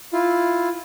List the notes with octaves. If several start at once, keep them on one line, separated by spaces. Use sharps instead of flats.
E4 F4